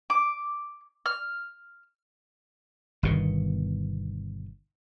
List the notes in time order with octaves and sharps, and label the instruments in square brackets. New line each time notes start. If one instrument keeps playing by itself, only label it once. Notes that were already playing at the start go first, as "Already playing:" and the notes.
[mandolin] D6
F6
[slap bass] G1 B2 D#3